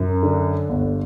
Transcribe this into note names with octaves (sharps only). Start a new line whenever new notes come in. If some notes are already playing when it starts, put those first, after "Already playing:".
Already playing: F#2
D3
G1